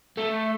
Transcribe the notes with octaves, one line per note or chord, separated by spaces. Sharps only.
A3